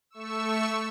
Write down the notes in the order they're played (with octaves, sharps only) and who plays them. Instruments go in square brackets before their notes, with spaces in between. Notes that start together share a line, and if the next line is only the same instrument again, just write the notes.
[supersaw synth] A3 C#6 E6